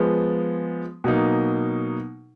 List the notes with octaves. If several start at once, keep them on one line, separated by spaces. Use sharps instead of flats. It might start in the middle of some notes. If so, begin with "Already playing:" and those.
Already playing: F3 G#3 B3
B2 F#3 A#3 D#4